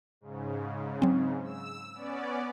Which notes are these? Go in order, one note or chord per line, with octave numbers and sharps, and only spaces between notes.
G#2 C#3
F#3 C4
E6
B3 C#4 D5